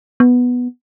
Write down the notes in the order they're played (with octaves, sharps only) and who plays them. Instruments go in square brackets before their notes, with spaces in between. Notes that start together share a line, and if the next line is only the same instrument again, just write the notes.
[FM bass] B3